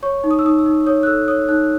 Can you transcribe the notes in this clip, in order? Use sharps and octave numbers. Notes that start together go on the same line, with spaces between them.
C#5 C#6
D#4
D#6
E6
D#4 D#6
E6
D#4
C#5 D#6
F#6
A4 E6
C#5 D#6
D#4 F#6